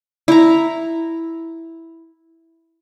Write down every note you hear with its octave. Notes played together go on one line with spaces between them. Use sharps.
E4 A#5